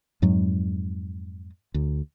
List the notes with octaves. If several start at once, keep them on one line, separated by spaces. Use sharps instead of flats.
F2 G#2 F#3 G#3
D2